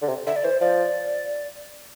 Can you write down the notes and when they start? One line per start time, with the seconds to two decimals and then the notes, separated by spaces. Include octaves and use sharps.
0.02 D3
0.09 C3
0.26 D3 E5
0.36 D5
0.44 E3 C5
0.61 F3 D5